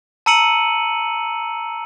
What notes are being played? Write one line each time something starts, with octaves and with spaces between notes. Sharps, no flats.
A5 A#5 E6 C#7 D#7 F#7